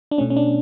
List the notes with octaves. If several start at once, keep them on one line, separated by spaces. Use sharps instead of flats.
D4
B2 A3 C#4
C#4
D4